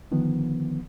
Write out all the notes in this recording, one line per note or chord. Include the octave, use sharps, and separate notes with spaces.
D3 D#3 F3 B3